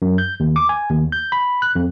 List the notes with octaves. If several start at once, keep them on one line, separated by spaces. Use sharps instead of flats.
F#2
G6
D#2
D6
G#5
D#2
G6
B5
F#6
F2